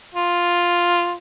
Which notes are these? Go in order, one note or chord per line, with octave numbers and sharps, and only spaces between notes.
F4